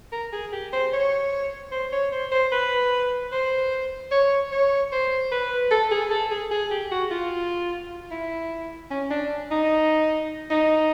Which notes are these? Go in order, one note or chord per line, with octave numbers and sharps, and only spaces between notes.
A#4
G#4
G4
C5
C#5
C5
C#5
C5
C5
B4
C5
C#5
C#5
C5
B4
A4
G#4
A4
G#4
G#4
G4
F#4
F4
E4
C#4
D4
D#4
D#4